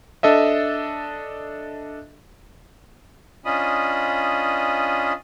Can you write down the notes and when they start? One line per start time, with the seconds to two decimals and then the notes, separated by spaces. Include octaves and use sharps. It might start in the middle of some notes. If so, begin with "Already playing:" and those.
0.23 D4 A4 D#5 E5
3.45 C#4 D4 F4 D#5 B5 D#6